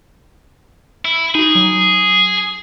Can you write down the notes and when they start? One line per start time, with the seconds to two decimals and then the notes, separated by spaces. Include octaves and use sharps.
1.05 E4 E6
1.35 D#4 F#4 G#4
1.55 F#3